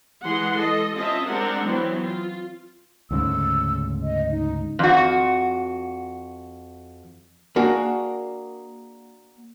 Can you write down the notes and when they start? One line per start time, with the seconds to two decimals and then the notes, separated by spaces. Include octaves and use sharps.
0.25 E3 G#3 G#4 F#5 C6
0.58 A4 D#5
0.96 C4 C#4 F4 D#5 E5 A5
1.27 G#3 C4 D4 A#4 F#5
1.66 E3 F#3 B3 C4 E4
2.04 F4
3.11 D2 G#2 C#3 E6
4.03 D#5
4.31 D#4
4.79 F2 F#4
7.56 A#3 D4 F#4 G#4